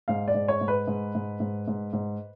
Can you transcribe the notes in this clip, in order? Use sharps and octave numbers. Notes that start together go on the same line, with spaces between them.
G#2 F5
D5
G#2
C#5
G#2
B4
G#2
G#2
G#2
G#2
G#2